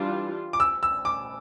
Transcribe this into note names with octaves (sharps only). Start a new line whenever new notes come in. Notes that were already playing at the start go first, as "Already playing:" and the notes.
Already playing: E3 G3 D4 F4
D6
E6
E6
D6